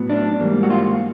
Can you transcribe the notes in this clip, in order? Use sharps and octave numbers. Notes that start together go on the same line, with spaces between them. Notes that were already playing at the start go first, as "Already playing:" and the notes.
Already playing: A2 F#3 B3
D4
G#2 E3 G3 A#3
F#4
F4